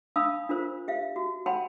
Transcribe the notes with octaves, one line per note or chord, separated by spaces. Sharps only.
D4 F5 A5 B5 D#6 E6
D4 F4 A#4 C5
G4 E5 F5
F#4
C#5 F#5 G5 A5 B5 C6